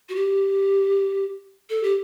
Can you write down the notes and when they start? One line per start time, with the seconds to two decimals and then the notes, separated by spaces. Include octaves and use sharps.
0.09 F#4
0.15 G4
1.70 A4
1.83 G4